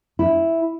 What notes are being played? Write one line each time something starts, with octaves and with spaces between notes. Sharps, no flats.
E4